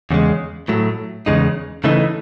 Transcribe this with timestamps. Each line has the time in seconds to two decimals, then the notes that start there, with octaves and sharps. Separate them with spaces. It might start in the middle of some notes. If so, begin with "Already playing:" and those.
0.11 E2 C#3 G#3
0.68 A2 F#3 A3
1.26 E2 C#3 G#3 D#4
1.84 C#3 E3 A3 D#4